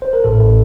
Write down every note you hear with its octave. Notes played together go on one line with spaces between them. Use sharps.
C5
A#4
A1 A2 A4